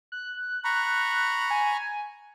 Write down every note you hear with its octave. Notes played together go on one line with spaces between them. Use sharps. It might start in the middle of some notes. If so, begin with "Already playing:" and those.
F#6
A#5 B5 C#6
G#5